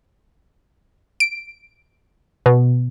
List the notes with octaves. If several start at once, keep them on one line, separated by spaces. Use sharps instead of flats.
D7
B2